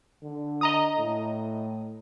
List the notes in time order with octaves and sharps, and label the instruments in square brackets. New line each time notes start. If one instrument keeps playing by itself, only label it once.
[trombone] D3
[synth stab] D#5 A#5 D#6
[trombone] A2